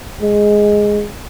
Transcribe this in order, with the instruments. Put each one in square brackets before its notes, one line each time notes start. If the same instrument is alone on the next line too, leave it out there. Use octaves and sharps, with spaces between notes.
[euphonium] G#3